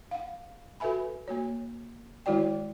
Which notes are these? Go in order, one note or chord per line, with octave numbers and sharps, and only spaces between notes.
F5 F#5
F#4 A4 B4 E5 G#5 B5
A#3 F#4 C#5
D#3 G#3 E4 F#4 D5 G5